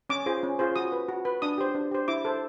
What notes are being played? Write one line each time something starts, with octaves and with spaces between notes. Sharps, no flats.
C#4 D6
F4 G#4 C5
C#4
F4 G#4 C5
F#4 D#6
B4
F#4
B4
D4 D#6
G4 C5
D4
G4 C5
E4 D6
A4 C5